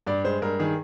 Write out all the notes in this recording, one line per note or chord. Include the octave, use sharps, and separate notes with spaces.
G2 D5
G#3 C5
G2 A#4
D#3 G#4